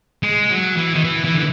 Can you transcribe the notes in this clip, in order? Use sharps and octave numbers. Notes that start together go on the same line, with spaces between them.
G#3
F#3
E3
D#3
E3
E3
D3